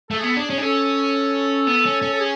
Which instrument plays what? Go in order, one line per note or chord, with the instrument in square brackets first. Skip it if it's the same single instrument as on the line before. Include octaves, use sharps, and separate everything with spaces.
[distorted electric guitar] A3 [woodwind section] A4
[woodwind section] G#4
[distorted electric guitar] B3 [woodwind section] A4
[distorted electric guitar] D4 [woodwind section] G#4
[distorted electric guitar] C#4
D4
[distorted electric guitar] C#4 [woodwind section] A4
[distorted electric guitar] B3
C#4
C#4
[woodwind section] A4
G#4